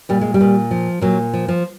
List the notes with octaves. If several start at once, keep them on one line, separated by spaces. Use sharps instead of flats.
A#2 G3
G#3
G3
A#2
F3
A#2 F#3
F3
F3